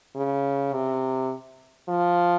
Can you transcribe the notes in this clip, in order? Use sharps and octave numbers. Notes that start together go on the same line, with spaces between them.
C#3
C3
F3